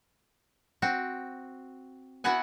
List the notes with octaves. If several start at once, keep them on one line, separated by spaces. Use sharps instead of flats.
C4 F#4
B3 E4 F#4 B4 F#5 G#5